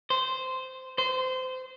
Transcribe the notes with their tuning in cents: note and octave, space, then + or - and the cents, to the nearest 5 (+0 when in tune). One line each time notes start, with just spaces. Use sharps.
C5 -15
C5 -25